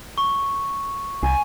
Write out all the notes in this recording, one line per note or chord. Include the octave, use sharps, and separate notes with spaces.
C#6
C2 G#5